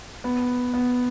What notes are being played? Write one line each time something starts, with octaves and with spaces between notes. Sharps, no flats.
B3
B3